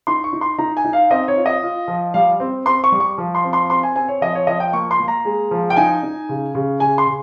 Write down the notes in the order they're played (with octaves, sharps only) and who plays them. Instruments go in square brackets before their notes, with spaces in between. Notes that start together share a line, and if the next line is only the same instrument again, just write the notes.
[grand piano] D#4 C6
C#6
D#4
C6
D#4 A#5
G#5
D#4
F5
C4 D#5
C#5
F4
D#5
F4
F3
G3 F5
C4
C4 C6
C#6
G3
C#6
F3
C6
C4
C6
C4 C6
G#5
C4 G#5
C#5
F3 D#5
C#5
F3 D#5
G5
A#3 C#6
C6
A#3
A#5
G#3
F3
G5
D#4 G#5
D#4
C#3
C#3
C#3 G#5
C6
C#3